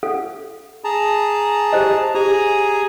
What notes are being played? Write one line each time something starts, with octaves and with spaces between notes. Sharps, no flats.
A4 F5 F#5
G#4 A5 A#5
G4 C5 D#5
G4 G#4 G#5 A#5